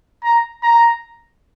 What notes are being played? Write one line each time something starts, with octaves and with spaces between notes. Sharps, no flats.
A#5
A#5